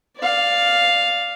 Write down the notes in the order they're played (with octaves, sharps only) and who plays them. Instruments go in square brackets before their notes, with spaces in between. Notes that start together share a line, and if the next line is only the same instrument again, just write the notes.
[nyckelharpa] D5 F5